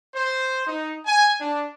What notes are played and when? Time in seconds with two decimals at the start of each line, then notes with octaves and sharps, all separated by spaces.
0.14 C5
0.65 D#4
1.06 G#5
1.40 D4